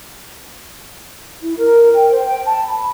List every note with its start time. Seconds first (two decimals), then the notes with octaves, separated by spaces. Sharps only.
1.40 E4
1.57 A#4
1.94 G5
2.11 C5
2.25 G5
2.45 A5
2.65 B5